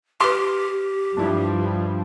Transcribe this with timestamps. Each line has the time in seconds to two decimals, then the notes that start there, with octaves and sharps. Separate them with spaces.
0.20 G4 B4 C6 D6 F6
1.17 G2 F3 G3 D4 E4